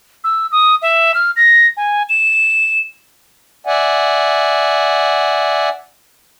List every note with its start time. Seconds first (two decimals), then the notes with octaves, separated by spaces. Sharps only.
0.24 E6
0.52 D#6
0.82 E5
1.14 F6
1.36 A#6
1.77 G#5
2.09 E7
3.66 D5 E5 F#5 G#5